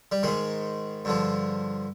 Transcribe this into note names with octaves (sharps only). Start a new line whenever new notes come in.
G3
G#2 D#3 G#3
G2 D3 F3